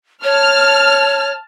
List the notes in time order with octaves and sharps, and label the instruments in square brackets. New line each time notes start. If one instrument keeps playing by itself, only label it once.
[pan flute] C#5 [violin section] A5 F6